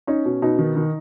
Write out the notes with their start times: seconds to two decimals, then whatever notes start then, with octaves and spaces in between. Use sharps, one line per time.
0.07 C#4 D#4
0.25 B2
0.42 B2 D#4
0.59 D#3
0.76 D#3